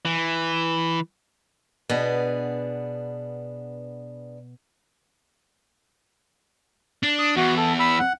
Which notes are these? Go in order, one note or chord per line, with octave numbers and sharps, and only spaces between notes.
E3
B2 B3 D4 G#4
D4
D#6
E2 F#4
A4
B5 E6
F#5